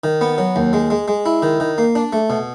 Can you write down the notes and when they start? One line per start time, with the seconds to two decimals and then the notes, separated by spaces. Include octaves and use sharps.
0.04 D#3
0.21 B3
0.38 F#3
0.56 D#2
0.73 G#3
0.90 G#3
1.08 G#3
1.26 E4
1.42 D#3
1.60 D#3
1.78 A#3
1.95 D4
2.13 A3
2.30 B2